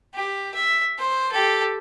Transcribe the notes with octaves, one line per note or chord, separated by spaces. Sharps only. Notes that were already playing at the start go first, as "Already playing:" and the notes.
G4
E5
C5
G4 A4